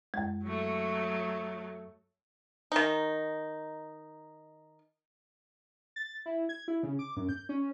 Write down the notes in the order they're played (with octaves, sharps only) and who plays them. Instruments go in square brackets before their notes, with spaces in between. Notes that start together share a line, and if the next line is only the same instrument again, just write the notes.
[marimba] F#2 G#3
[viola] F#3 A3
[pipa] D#3 D#4
[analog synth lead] A6
E4
G#6
E4
C#3
D6
F#2
G6
C#4